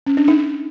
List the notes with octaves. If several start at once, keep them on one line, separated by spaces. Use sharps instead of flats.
C#4
D4
D#4